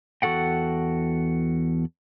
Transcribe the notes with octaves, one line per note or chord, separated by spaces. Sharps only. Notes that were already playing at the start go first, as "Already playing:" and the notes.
E2 F#4 A4 F#5 G5